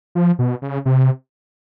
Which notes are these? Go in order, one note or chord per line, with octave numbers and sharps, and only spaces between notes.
F3
B2
C#3
C3